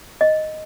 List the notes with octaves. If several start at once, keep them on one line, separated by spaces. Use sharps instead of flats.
D#5